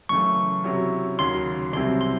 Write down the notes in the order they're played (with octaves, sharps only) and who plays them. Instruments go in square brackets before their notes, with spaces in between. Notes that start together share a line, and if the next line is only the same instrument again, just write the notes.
[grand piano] F#2 C#3 E3 A3 [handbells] C#6
[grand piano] C3 F#3 C#4 E4
[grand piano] D#2 C#3 F#3 [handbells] C6
[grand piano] C2 C3 F#3 C4 E4 [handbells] C6
[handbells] C6